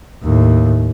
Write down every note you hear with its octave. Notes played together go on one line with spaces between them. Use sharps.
D#2 A2